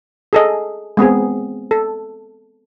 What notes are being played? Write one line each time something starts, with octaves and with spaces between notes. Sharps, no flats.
G#4 A4 D#5
G#3 B3 C4 G#4
A4